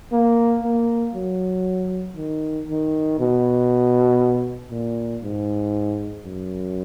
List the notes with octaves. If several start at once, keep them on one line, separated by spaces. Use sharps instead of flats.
A#3
A#3
F#3
D#3
D#3
B2
A#2
G#2
F#2